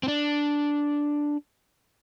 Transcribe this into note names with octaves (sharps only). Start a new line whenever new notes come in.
C4
D4